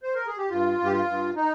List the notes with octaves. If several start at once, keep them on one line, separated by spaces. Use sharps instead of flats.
C5
A#4
G#4
G4
G2 F4
G2
G4
F4
G2
D#4